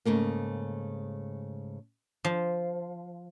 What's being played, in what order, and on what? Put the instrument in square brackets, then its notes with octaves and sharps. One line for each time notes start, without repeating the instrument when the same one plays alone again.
[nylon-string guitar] G#2 C#3 A3 A#3
[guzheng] F3